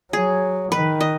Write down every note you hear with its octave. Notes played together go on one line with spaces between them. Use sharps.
F#3 G#4
D#3 B4
D#5